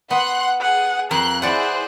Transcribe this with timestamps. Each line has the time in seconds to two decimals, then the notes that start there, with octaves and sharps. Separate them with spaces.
0.11 B3 F#5 C6 F#6
0.61 G#4 F#5
1.11 F2 A#4 C6 F#6
1.42 E4 G#4 C5 D5 F#5 F#6